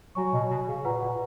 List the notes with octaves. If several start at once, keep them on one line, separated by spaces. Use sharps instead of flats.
F#3 F#4 C#5 G#5 C#6
B2
B2
C#3
A#2 B4 F#5 A#5
A#2